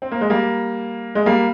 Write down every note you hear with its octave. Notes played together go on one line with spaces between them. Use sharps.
C4
A#3
G#3
G3 A#3
G#3
G3 A#3